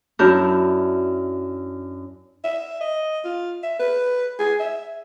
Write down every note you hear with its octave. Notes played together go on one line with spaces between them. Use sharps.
F#2 D4 E4 F#4 A#4 G6
E5
D#5
F4
E5
B4
G#4
E5